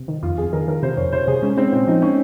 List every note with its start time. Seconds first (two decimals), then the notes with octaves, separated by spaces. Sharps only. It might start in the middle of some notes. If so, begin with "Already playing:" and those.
Already playing: C3
0.08 D#3
0.23 F2 F4
0.38 F2 G#4
0.53 D#3 A#4
0.68 D#3 A#4
0.83 C3 C5
0.97 F2 C#5
1.12 C3 C5
1.28 C3 G#4
1.43 G#3 C#4
1.57 G#3 C4
1.73 A#2 C4
1.87 F3 D#4
2.02 G#3 C#4